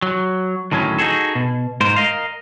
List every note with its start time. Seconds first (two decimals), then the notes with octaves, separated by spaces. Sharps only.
0.02 F#3
0.72 D2 A2 D#3 F#3 C#4
0.98 D#4 F#4 G#4 A4
1.35 B2
1.81 G#2 A#4 C5
1.96 A#4 D#5 F5